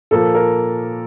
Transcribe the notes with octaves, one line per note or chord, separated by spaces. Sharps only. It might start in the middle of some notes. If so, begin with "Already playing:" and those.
A#2 F3 A#3 A4
A#4